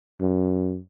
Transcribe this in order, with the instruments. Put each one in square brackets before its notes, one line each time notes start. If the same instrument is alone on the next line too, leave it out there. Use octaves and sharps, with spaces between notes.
[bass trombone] F#2